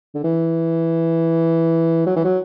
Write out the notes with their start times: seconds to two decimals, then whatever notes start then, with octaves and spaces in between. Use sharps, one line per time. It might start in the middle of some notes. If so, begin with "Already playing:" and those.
0.15 D3
0.24 E3
2.07 F#3
2.16 E3
2.24 F#3